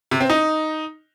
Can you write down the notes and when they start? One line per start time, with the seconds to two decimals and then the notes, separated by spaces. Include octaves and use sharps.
0.11 C3
0.20 C4
0.30 D#4